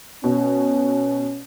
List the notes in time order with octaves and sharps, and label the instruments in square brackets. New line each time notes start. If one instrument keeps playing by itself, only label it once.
[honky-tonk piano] B2 [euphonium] C#4